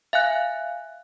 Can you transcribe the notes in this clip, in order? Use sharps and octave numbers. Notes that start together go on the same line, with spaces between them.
E5 F5 G#5 F#6